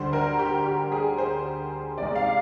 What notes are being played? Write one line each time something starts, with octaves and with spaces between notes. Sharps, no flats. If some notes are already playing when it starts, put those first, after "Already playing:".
Already playing: D2 D3 G3 C5
A#4
G4
G4
G#4
C5
C2 C3 D#3 G#3 D5
F5